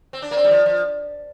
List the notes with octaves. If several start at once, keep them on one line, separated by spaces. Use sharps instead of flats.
C4
D4
A#3
C4
G3
F3
F3